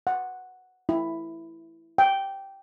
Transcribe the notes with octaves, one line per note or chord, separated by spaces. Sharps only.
F#5
E4
G5